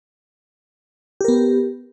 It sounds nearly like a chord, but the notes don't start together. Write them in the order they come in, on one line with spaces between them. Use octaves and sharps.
G4 A#4 B3